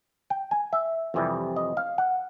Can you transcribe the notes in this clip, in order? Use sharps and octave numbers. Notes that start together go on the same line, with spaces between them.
G5
G#5
E5
F2 C3 E3 G3
D#5
F5
F#5